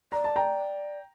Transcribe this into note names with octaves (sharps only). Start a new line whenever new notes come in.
D5 A#5
A5
G5 A#5